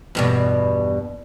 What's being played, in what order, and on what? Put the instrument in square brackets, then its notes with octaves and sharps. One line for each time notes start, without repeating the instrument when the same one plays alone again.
[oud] E2 G2 B2